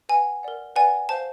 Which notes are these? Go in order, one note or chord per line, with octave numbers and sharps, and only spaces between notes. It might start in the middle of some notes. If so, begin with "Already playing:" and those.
B4 D#5 F#5 G#5
A#4 D5 F#5
B4 D5 F#5 G#5
C5 F5 A5